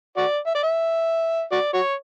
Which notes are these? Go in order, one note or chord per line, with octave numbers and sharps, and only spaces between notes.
F#4 D5
E5
D5
E5
F#4 D5
F#4 C#5